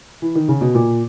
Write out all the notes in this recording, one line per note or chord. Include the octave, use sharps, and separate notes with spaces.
E3
D#3
C#3
B2
A#2